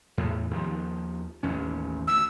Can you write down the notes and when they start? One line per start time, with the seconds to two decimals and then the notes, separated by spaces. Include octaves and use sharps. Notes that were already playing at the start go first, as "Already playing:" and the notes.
0.18 E2 A2
0.51 D#2 D#3 F3
1.43 A1 D#2 C#4
2.07 D2 E6